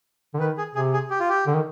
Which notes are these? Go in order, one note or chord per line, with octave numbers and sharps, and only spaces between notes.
D3
D#3 B4
G#4
C3 G#4
G#4
G4
F4
G4
D3
D#3